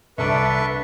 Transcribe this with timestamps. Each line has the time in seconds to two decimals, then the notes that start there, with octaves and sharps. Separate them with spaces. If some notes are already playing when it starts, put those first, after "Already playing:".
0.18 C2 D4 A4 B4 E5 C#6